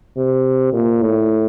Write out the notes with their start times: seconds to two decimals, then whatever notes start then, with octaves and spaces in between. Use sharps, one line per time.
0.17 C3
0.73 A#2
1.02 A2